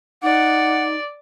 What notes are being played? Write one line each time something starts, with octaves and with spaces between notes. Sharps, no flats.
D#4 D5 F#5